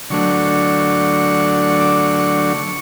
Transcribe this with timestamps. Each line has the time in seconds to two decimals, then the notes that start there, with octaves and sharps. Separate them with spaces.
0.10 D3 F#3 A3 D4 C#6
1.62 C#6
1.80 D6
2.00 C#6
2.19 C#6